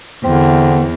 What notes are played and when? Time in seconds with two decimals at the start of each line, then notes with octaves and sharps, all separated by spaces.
0.24 E2 D3 C4